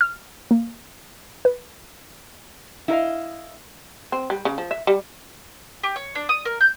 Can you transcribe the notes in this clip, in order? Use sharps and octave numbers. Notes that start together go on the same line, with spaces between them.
F6
A#3
B4
E4 F4 A#4 D#5 F5
C4
G3
C#3
F3
E5
G3
G4
C#5
D4
D#6
A#4
G6